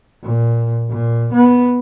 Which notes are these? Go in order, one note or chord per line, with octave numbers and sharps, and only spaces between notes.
A#2
A#2
B3